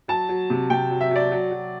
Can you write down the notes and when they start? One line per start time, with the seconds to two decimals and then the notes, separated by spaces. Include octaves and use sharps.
0.08 F#3 A5
0.29 F#3
0.50 C3
0.70 C3 G5
0.91 F#3
1.01 E5
1.11 F#3 D5
1.32 F#3
1.51 F#3